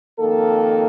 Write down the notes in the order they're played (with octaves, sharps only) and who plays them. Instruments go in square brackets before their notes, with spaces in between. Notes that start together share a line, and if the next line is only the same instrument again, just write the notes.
[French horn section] F2 D#3 A#3 A4